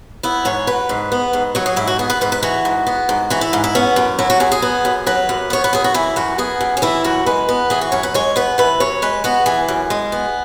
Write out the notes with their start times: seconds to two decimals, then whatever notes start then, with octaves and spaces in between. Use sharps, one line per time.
0.23 B3 E4
0.45 G#2 C#5
0.67 F#3 B4
0.89 G#2
1.12 B3
1.33 G#2
1.55 F#3 C#5
1.66 G#4
1.76 G#2 E4
1.87 F#4
1.99 B3 G#4
2.10 B4
2.21 G#2 B4
2.32 B4
2.43 E3 F#4
2.65 G#2
2.87 B3
3.09 G#2
3.30 E3 F#4
3.41 E4
3.53 G#2
3.64 E4
3.75 B3 C#4
3.96 F#2
4.19 F#3 E4
4.30 F#4
4.40 F#2 G#4
4.52 G#4
4.62 B3
4.85 F#2
5.07 F#3 B4
5.29 F#2
5.50 B3 C#5
5.64 B4
5.73 F#2 G#4
5.84 F#4
5.94 E3 E4
6.16 F#2 F#4
6.38 B3 G#4
6.61 F#2
6.77 C#4
6.82 E3 E4
7.04 F#2 F#4
7.26 G#3 B4
7.49 B3
7.70 E3 G#4
7.81 F#4
7.92 F#2 C#5
8.03 B4
8.14 G#3 C#5
8.36 B3 B4
8.58 E3 B4
8.80 F#2 C#5
9.02 G#3 B4
9.24 B3 F#4
9.46 E3 G#4
9.68 F#2
9.90 G#3
10.12 B3